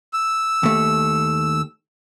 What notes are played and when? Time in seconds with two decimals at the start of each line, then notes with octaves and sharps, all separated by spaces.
0.13 E6
0.63 D#2 A3